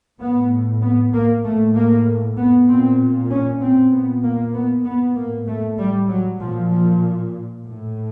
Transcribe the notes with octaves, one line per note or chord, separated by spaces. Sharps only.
A2 B3
B3
A#3
A2 A3
A#3
B3
A#2 C4
C#4
C4
A#2 B3
A#3
B3
B3
A2 A#3
A3
G3
F#3
A#2 F3
F3
A2